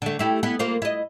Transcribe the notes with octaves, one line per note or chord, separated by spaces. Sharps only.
D3 A3
A3 E4 G4
B3 E4
A#3 F4 C5
E4 D#5